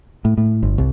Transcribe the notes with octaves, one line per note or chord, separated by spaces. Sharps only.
A2
A2
G1
C2